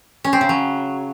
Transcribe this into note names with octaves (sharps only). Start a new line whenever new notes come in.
C#4
C4
C#3
F#3